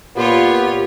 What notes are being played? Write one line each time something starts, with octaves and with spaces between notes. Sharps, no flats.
A#2 B3 F4 G4 C#5